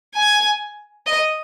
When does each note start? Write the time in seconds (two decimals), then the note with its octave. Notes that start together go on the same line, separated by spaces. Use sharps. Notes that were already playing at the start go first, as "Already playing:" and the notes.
0.14 G#5
1.06 D#5